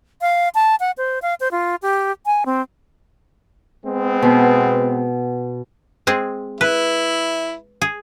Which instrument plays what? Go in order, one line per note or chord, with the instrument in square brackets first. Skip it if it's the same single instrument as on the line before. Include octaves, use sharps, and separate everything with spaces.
[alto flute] F5
A5
F#5
C5
F5
C5
F4
G4
G#5
C4
[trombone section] G#3 B3 C4
[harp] B2
[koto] G#3 C4 G#4
[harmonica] E4 [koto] B4
[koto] G#4